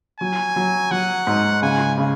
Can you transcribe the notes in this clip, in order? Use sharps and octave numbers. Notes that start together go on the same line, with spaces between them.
F#3 G#5
F#3
F#3 F#5
G#2
C#3 G#5
C#3